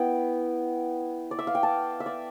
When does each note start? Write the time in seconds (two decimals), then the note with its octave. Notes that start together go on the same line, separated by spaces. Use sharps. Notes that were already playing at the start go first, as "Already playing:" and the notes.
Already playing: B3 E4 G5
1.31 D5
1.39 E5
1.47 F5
1.55 G5
1.63 A5
2.00 E5
2.06 D5